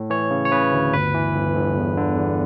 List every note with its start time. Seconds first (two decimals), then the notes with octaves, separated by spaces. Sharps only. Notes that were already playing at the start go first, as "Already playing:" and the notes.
Already playing: A2
0.10 E3 C#5
0.31 C#3
0.45 C#5
0.52 C#3 B4
0.72 D2
0.94 G1 B4
1.15 E3
1.35 G1
1.56 G1
1.77 E2
1.97 D3
2.18 E2